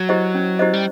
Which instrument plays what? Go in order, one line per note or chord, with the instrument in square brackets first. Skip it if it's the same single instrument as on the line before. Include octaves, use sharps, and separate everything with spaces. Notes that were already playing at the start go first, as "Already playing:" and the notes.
Already playing: [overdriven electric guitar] F#3
[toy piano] E4 G4 C5 D#5
C#4
E4 G4 C5 D#5
[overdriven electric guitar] G3